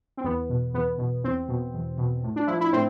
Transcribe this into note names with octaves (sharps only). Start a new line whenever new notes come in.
C4
E2 B3
B2
E2 B3
B2
E2 C4
B2
E2
B2
A2
D4
F3 E4
E4
A2 C4